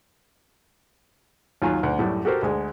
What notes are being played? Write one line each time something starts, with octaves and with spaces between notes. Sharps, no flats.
D#2 F#3 F4 F5 G#5
D2
F#2 A2 G3
F#4 G4 A4 A#4 C5
D2 G#3